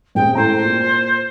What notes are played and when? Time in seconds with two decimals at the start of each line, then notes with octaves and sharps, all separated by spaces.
0.15 D#1 G#3 C4 G5
0.35 A2 A4 C5 A#5
0.64 A#2